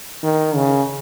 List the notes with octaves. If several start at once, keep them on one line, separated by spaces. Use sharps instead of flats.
D#3
C#3